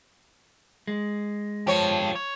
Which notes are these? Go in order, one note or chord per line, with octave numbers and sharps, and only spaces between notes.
G#3
F3 G4 A4 C#5
C#5